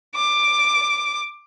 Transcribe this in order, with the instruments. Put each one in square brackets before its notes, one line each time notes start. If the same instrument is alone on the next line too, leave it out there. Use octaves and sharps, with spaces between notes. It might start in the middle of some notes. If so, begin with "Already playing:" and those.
[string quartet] D6